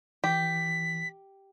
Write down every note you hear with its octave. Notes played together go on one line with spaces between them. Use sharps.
E3 G4 B6